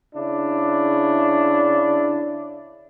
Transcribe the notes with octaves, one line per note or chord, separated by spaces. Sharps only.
C#3 D4 E4